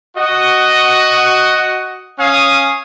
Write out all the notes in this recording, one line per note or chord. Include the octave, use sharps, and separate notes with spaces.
F#4 D#5
C#4 F5 G#5 D#6